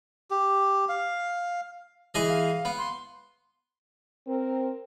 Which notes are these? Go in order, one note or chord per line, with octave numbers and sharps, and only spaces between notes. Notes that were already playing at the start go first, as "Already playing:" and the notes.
G4
F5
E3 G#4 D#5
F5
B3
C6
C4 A#4